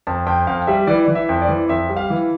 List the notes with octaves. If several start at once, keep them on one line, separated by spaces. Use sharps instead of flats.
F2 A5
F2 G5
F2 F5
G3 E5
E3 D5
D5
E3
E5
F2
D5
E3
F2 E5
G3
F5
E3